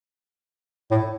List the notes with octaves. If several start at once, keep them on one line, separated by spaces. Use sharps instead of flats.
A2